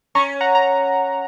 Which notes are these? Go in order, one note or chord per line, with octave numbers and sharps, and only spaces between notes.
C#4 A#5 C#6
F#5 A#5
A#5